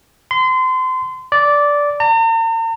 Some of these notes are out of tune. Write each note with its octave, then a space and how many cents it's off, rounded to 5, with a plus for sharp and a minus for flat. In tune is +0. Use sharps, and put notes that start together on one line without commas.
C6 -30
D5 -10
A#5 -45